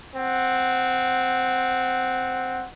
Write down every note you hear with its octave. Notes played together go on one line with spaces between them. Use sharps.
C4 F#5